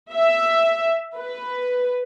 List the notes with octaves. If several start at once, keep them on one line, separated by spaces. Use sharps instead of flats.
E5
B4